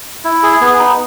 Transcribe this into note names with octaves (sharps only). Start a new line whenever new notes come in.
E4
G#4
B3
D#4